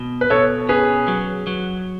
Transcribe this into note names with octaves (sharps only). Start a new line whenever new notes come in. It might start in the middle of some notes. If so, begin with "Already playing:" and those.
Already playing: B2
B4
B2 A4 C#5
C#4 G#4 B4
F#3
F#3